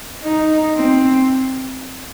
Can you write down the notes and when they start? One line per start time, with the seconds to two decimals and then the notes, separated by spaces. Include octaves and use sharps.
0.24 D#4
0.75 C4